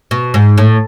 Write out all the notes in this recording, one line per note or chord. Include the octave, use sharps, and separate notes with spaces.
B2
G#2
A2